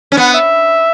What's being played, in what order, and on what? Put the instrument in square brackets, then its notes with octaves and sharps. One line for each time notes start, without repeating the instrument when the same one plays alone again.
[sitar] C#4
[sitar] B3 [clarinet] F#5
[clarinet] E5